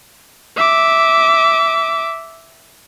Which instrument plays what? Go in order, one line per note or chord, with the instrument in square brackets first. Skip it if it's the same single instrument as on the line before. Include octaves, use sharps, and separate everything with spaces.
[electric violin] E5 D6